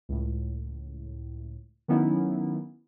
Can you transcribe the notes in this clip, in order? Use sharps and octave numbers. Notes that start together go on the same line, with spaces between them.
C#2 A2
D#3 F#3 B3 C#4 D#4 E4